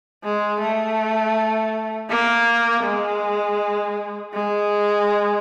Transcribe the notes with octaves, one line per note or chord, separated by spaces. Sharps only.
G#3
A3
A#3
G#3
G#3